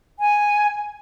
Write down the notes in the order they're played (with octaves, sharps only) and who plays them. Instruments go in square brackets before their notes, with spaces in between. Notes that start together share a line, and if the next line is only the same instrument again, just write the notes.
[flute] G#5